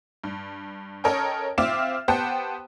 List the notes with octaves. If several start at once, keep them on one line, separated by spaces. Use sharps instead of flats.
G2
C#4 A4 A#4 C#5 D#5 G5
C4 F4 E5 D6 F6 E7
B3 G4 C5 F#5 G5 A5